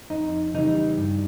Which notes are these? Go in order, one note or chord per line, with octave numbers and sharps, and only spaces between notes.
F2 D#4
C#3 E3 G3 D#4
G2